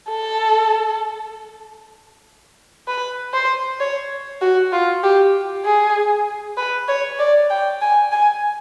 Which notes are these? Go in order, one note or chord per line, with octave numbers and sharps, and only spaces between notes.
A4
B4
C5
C#5
F#4
F4
G4
G#4
B4
C#5
D5
G5
G#5
G#5